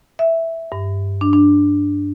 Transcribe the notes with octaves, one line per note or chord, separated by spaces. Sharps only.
E5
G2
D4
D4